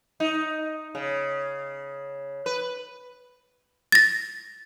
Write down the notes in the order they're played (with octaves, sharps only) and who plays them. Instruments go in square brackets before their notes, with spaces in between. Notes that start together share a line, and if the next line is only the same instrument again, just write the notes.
[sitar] D#4
C#3
B4
[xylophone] A6 A#6